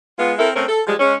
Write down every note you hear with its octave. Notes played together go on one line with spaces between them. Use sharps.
G#3 B3 F4
C4 E4 A4 A#4
A3 C4 C#4 A#4
A4
F3 G3 G#3
G#3 C#4